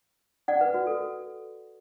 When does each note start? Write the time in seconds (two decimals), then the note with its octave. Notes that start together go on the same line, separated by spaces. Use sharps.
0.48 D5 F#5
0.61 B4
0.74 F#4
0.87 A4